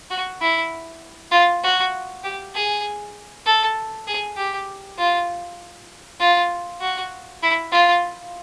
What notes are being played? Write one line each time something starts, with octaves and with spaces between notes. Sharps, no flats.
F#4
E4
F4
F#4
G4
G#4
A4
G#4
G4
F4
F4
F#4
E4
F4